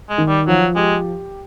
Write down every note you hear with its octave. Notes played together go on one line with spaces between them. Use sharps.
G#3
D#3
G3
F3 F#3
G#3 G4